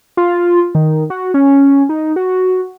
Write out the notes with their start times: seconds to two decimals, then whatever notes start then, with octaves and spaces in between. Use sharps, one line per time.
0.17 F4
0.75 D#3
1.10 F#4
1.34 C#4
1.89 D#4
2.16 F#4